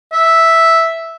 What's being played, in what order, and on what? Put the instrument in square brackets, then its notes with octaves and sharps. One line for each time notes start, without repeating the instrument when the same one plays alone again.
[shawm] E5